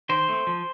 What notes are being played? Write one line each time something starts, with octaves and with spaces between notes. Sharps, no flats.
D#3 C5
A3 C4
F3